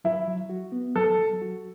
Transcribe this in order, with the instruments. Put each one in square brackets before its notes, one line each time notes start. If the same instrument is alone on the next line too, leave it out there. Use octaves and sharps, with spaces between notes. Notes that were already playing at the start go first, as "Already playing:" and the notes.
[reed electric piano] F#3 [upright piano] E4
[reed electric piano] F#3
F#4
B3
[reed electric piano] F#3 [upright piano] A4
[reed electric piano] F#3
F#4